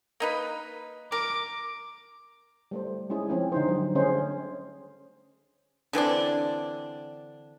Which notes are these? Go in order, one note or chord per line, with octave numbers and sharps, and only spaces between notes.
A#3 D#4 B4
A#4 D6
G3 A3 C5
G#3 C#4 E4 G#4
F3 C4 C#4 E4
D3 D#4 C5
F#3 G3
D3 A3 C#4 G#4 C5
D3 E3 C4 D4